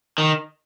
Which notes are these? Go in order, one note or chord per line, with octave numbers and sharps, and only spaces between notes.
D#3